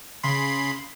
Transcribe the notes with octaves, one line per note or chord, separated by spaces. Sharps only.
C#3 B5 C6